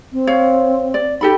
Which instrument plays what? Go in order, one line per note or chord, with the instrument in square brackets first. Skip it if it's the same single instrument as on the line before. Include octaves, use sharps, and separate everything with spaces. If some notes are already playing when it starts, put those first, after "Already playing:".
[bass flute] C4
[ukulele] C#5 F5
D5
[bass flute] D#4 [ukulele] G4 A4 B5